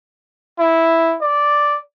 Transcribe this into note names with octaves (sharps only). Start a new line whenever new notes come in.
E4
D5